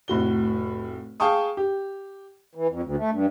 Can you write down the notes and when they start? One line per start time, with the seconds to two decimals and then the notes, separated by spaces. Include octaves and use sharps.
0.08 F1 A2 F#4 G7
1.20 G#4 F5 G5 A5 C#6 D#6
1.57 G4
2.55 E3
2.68 F2
2.83 D2
2.97 A3
3.11 G2